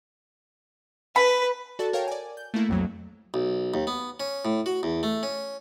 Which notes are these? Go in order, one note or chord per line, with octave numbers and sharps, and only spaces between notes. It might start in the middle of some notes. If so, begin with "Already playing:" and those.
B4 B5
F#4 A4 D5 A5 A6
A#4 C#5 F5 G5 A5
D5 G#5
G6
A3 A#3 E4
B1 F2 F#3
B1
D#2
B3
C#4
A2
F#4
E2
A3
C#4